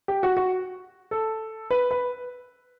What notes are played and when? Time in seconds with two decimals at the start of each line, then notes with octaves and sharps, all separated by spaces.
0.08 G4
0.23 F#4
0.37 F#4
1.11 A4
1.71 B4
1.91 B4